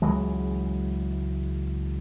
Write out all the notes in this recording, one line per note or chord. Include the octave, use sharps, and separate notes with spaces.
C#2 E3 F#3 G#3